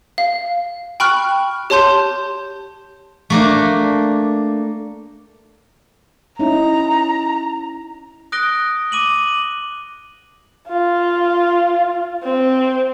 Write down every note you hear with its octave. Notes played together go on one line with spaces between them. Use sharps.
F5
G5 B5 C#6 F6 F#6
G4 C#5 A5 C6 G6
A3 A#3 D4
C#4 D#4 E4 A#5
D#6 F#6 A#6 D7 G7
D6 D#7 F#7 G7
F4
C4